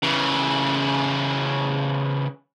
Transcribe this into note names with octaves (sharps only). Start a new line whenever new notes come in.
C#3 E3